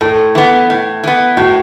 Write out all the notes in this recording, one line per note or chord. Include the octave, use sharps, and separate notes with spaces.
A2 A4
E3 B3
A2
E3 B3
A2 F#4